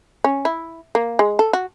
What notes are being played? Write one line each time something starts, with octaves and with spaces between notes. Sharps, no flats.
C#4
E4
A#3
G#3
A4
F#4